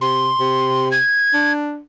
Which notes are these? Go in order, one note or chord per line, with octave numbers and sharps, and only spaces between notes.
C3 C6
C3
G#6
D4